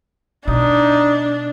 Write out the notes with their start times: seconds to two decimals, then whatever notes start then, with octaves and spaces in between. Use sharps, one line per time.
0.48 B2 D4 D#4